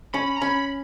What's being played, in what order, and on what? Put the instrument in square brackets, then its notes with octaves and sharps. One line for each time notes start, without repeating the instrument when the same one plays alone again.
[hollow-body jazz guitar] C#4 [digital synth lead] B5
[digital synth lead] A#5
[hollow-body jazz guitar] C#4 [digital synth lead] B5